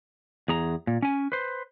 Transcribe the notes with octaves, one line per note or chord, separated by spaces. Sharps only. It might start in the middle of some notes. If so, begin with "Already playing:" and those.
E2 G#4 A#5
A#2
C#4 G#5
B4 C5